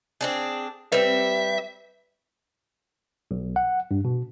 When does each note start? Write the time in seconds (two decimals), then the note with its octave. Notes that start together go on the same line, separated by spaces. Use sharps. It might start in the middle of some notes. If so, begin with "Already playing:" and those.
0.21 C4 D4 G#4
0.92 G3 C4 B4 E5
3.31 B1
3.56 F#5
3.91 G2
4.05 B2